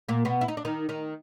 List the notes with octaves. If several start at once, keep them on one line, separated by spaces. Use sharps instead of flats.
A#2 A#3
B2 B3
E4
D#4
D4
D#3 D#4
D#3 D#4